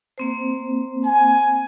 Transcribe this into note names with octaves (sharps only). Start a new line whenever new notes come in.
A#3 C4 C5
G#5